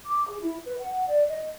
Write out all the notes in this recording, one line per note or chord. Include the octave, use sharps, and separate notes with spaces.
D6
G#4
E4
B4
F#5
D5
D#5